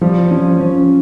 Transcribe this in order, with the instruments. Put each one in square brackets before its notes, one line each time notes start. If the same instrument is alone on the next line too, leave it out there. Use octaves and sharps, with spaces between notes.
[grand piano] F3 [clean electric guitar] G3
[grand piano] F3 [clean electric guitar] C#4
[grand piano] F3 [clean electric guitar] C#4